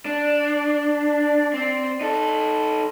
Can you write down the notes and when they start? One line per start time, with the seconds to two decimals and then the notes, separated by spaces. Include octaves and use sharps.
0.05 D4 D5
1.54 C4
2.01 D#4 A4